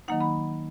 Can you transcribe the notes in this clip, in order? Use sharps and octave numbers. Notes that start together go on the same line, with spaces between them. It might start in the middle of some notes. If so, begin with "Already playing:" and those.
D#3 F#3 A#3 D#4 F#5
B5